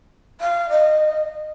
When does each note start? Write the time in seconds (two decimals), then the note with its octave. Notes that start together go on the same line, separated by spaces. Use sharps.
0.41 F5
0.69 D#5